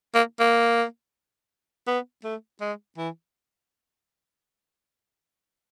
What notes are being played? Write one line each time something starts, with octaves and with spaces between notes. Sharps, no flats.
A#3
A#3
B3
A3
G#3
E3